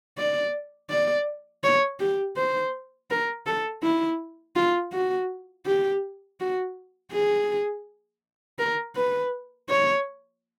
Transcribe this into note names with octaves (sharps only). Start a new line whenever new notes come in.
D5
D5
C#5
G4
C5
A#4
A4
E4
F4
F#4
G4
F#4
G#4
A#4
B4
C#5